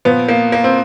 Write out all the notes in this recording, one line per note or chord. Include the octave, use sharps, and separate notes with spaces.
A#2 F3 B3
A#3
A#3
C4